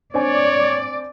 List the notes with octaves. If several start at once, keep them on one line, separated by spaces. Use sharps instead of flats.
C4 D4 C#5 D5 G#5